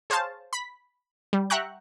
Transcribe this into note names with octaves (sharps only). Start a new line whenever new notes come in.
G#4 C5 C#5 F5 A5
B5 B6
G3
E5 F#5 G5 A#5 C#6 F#6